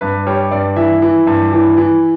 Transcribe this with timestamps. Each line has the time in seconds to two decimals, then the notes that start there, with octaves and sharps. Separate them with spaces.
0.01 G2 B4
0.27 G3 C#5
0.51 G2 D5
0.76 E3 E5
1.02 E3
1.27 G2
1.52 E3
1.77 E3